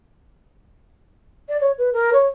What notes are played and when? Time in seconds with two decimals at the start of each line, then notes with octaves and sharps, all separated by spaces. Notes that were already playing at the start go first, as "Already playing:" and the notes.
1.49 D5
1.61 C#5
1.78 B4
1.93 A#4
2.13 C#5